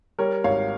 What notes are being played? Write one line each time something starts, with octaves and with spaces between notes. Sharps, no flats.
G3 A#4 C#5
G#1 C#5 F5